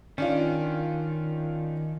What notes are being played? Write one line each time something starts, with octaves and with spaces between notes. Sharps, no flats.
D#3 C#4 D4 F4